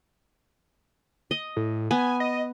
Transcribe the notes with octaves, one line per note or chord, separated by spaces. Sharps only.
D#5
A2
B3 G#5
D#5